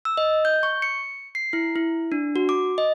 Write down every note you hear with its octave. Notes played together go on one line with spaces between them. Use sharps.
E6
D#5
G6
C#6
C#7
C7
E4
E4
D4
F#4
D6
D#5